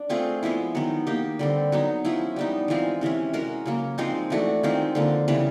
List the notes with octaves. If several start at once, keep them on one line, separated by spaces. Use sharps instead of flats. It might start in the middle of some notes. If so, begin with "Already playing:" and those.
Already playing: D4
A3 C4 F4 G#4
F3 G#3 B3 E4
D#3 F#3 B3
A#3 D#4 G4
D3 G3 C4
F#3 B3 D#4
F3 G#3 C#4 E4
G3 B3 D#4
E3 G#3 C4 F4
C3 E3 G#3 C#4
G#3 C#4 F#4 A#4
C#3 F#3 A#3
F3 G#3 C4 D#4
E3 A3 D4 F#4
D#3 G#3 C4 F4
D3 F3 A#3
C#3 E3 G3 B3